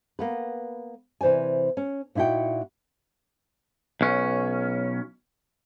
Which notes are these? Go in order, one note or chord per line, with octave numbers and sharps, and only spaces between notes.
A#3 B3 B4
C3 E3 C5 D5 G#5
C#4
A#2 D#4 E4 F#4 G5
B1 C#4